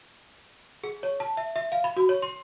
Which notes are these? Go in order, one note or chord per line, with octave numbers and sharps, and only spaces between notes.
G#4
C#5
A5
E5
E5
F5
B5
F#4
C#5
C6